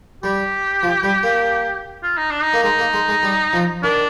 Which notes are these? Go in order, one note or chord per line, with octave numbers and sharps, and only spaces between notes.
G3 G4
F3
G3
A#3
F4
D#4
D4
D#4
A#3
G#3 D#4
A#3
G#3
G#3
G3
F3
D#3 D4